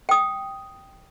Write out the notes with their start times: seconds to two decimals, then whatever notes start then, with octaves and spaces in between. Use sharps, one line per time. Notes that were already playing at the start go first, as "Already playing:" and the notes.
0.09 G5 D#6